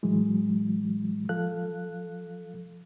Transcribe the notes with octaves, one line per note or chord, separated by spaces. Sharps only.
A2 E3 F#3 G#3
F3 A4 F5 F#6